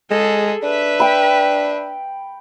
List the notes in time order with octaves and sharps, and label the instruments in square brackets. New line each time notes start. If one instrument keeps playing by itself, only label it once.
[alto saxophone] G#3 [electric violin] G#4 A4
[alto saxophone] D4 [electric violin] B4 E5
[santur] G5 B5